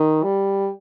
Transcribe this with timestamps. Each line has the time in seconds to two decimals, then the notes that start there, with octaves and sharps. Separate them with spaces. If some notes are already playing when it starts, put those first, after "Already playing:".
Already playing: D#3
0.23 G3